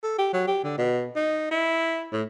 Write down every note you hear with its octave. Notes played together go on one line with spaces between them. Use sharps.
A4
G4
F#3
G4
D3
B2
D#4
E4
A2